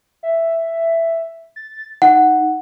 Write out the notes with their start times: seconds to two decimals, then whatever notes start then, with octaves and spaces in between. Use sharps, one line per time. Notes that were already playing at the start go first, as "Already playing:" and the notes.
0.23 E5
1.56 A6
2.02 D#4 F#5